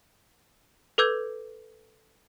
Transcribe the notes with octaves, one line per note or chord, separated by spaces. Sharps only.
A4 B4 D6 E6 G6 G#6